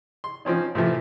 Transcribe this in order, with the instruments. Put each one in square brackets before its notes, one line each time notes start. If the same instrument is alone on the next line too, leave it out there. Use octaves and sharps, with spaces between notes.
[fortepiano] C6
F3 C4 C#4 D#4
A2 C3 E3 F3 A3